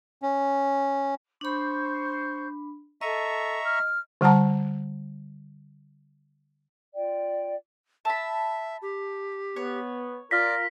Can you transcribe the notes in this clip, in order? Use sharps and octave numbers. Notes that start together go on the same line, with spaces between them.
C#4
D4 C5 B5 C#6 G6
A4 D#5 E5 A#5 C#6
F6
D3 G3 F#5 A5 A#5
F4 D5 G5
E5 A5 B5
G4
B3 C#5
F4 A#4 D5 F6 A#6 B6